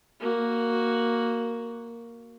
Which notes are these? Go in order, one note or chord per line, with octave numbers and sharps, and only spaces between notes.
A#3 F#4